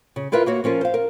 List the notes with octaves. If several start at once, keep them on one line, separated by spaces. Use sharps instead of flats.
C#3
E4 F4 A#4 B4 E5 F5
A#3 F#4 C#5
F3 C#4 F4 A#4
C5 F5
A#4